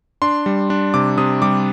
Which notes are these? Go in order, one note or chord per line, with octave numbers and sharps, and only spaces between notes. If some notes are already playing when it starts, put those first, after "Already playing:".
D4 C6
G3
D4
C3 D6
C3 D#6
G3 D6